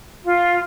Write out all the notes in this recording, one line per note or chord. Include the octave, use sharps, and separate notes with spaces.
F4